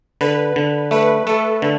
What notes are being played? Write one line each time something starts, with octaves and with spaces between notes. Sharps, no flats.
D3 B4
D3
A3 B4
A3 A4
D3